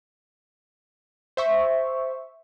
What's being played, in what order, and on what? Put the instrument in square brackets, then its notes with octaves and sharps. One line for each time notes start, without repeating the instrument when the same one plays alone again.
[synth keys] C5 E5 C#6